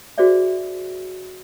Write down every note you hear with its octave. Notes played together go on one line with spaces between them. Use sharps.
F#4 G#4 C5 D5 E5